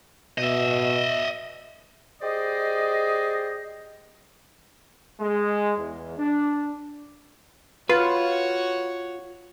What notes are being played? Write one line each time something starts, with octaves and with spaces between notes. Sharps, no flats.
B2 D#5 E5
G4 G#4 C5 D5 D#5
G#3
E2
D4
F4 F#4 B4 C#5